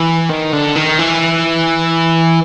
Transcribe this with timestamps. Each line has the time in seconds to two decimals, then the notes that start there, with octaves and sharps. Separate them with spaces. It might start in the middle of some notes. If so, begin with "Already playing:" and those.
Already playing: E3
0.29 D#3
0.52 D3
0.75 D#3
0.99 E3